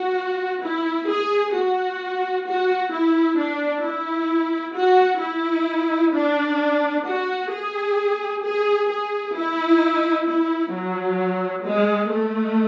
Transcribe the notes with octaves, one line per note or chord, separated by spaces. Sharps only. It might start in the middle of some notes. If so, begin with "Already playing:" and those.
Already playing: F#4
E4
G#4
F#4
F#4
E4
D4
E4
F#4
E4
D4
F#4
G#4
G#4
G#4
E4
E4
F#3
G#3
A3